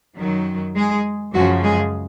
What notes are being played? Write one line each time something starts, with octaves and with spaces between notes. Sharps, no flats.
F#2 D#3 F#3
G#3 G#4
F#2 C#3 F3 F#3 F#4
G#3 G#4